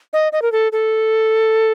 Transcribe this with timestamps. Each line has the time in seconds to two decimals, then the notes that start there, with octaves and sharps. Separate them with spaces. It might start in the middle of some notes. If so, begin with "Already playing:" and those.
0.13 D#5
0.32 D#5
0.42 A#4
0.52 A4
0.72 A4